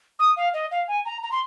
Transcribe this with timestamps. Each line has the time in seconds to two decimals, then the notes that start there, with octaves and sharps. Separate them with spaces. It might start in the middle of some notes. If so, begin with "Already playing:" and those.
0.19 D#6
0.36 F5
0.54 D#5
0.71 F5
0.88 G#5
1.05 A#5
1.23 A#5
1.31 C6